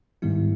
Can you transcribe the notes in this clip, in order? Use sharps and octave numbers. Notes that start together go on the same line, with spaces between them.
G#2 D#3 G3 B3 E4